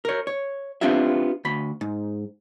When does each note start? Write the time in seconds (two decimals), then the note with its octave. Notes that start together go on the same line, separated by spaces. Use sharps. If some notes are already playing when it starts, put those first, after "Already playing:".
0.05 A#4 C#5
0.27 C#5
0.81 B3 C4 D4 F4 G4 E5
1.45 D2 B5
1.81 G#2